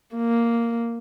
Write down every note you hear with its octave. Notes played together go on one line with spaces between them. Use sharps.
A#3